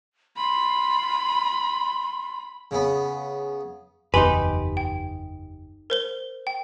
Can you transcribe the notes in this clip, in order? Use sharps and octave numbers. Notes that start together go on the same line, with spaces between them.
B5 C6
C#3 B3
F#1 E2 D#4 G4 B4 G#5 B5 C6
G5
A#4 C5 G7
G5